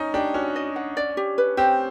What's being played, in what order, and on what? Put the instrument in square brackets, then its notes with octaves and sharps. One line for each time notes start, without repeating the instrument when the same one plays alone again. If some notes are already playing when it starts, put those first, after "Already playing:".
Already playing: [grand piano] C#4 D#4
[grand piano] D4 [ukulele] G4
[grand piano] C#4 [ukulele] F#4
[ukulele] D#5
F#5
D5
G4
B4
[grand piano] C4 [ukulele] G4